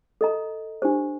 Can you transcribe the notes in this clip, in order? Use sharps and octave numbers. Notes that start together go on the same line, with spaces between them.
A4 D#5 A#5
D4 G4 C5